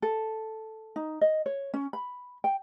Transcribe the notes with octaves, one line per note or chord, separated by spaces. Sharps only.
A4
D#4
D#5
C#5
C#4
B5
G5